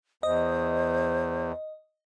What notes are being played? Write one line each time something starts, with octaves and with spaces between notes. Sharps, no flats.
E2 C5 D#5